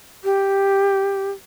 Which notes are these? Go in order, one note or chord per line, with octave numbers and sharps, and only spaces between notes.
G4